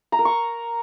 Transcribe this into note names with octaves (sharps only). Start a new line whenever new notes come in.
A#5
A#4
C#6